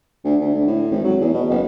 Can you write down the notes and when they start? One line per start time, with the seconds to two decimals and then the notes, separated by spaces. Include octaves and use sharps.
0.24 D2
0.41 D2
0.54 D2
0.67 A2
0.91 G#1
1.04 F#3
1.21 E2
1.33 B2
1.50 F#1